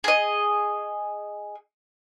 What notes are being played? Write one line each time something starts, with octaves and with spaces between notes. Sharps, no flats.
G#4 D#5